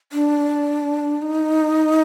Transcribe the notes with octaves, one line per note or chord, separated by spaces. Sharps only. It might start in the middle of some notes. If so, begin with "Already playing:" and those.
D4
D#4